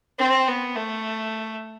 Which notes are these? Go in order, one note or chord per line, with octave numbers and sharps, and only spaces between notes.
C4
B3
A3